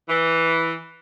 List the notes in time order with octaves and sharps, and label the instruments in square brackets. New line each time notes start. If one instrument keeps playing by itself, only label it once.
[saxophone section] E3